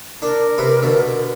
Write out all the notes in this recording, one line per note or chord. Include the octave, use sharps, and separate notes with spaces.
D4 A#4
C3 B4
B2 D3